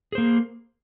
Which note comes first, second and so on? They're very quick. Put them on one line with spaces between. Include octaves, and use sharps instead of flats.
G#4 C5 A#3